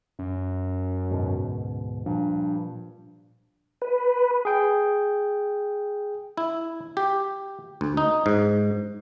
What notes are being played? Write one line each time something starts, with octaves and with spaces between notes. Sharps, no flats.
F#2
D2 G#2 B2
G2 A#2 F3
B4
G#4 G5
E4
G4
D2
D#4
G#2